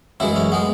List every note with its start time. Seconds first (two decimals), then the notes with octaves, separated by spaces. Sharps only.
0.20 F#2 E3 G#3 E4
0.36 C#4
0.52 G#3 B3